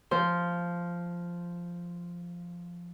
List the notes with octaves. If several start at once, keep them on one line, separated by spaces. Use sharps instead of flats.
F3 C5